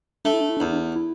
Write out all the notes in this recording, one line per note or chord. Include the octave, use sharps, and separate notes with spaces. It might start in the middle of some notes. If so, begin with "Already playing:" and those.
A3 D4
E4
D4
E4
D4
E2
E4
D4
E4